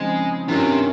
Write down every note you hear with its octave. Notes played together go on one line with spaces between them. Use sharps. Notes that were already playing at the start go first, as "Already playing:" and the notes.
Already playing: C#3 F3 G#3 C4 D#4
G2 C3 D#3 A#3 C#4 F4